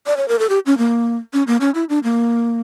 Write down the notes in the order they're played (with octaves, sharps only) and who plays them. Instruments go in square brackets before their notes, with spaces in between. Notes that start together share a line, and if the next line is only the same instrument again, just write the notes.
[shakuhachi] D5
C#5
A#4
A4
G4
C#4
A#3
C#4
A#3
C#4
E4
D4
A#3